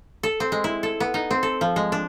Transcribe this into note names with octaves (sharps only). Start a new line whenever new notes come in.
A4
C4
G#3
E4
A4
B3
D#4
C4
A4
F3
G#3
D4